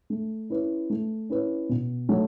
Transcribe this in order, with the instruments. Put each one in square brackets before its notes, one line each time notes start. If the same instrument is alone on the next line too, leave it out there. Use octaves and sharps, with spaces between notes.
[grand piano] A3
C#4 E4 B4
A3
C#4 E4 B4
B2
F#3 A3